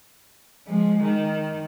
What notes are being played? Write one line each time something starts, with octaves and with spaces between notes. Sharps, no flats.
F3 G#3
D#3